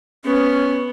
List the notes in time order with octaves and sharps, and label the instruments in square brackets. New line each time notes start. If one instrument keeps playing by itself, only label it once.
[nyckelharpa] B3 [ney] C#4